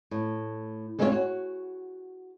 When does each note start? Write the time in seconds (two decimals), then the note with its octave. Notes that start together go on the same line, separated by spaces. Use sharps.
0.11 A2
0.99 G3 G#3 C4 F4 G4 C#5
1.12 F#4